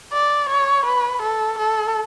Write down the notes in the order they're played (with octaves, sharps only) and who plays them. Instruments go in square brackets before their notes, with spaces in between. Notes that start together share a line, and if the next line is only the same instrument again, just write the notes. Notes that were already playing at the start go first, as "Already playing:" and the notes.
[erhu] D5
C#5
B4
A4
A4